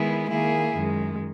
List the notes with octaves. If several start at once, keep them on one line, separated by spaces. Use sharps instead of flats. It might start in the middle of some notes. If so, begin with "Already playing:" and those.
Already playing: D#3 G#3 B3 E4 G#4
D#3 A#3 E4 G#4
F#2 D#3 G#3